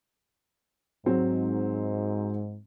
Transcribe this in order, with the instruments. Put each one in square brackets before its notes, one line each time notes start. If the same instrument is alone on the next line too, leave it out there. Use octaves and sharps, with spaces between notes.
[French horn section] G#2 [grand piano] F#3 C4